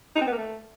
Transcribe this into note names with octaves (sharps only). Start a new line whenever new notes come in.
D#4
C4
B3
A#3
A3